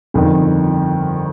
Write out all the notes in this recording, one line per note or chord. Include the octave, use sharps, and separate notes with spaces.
G1 F2 D#3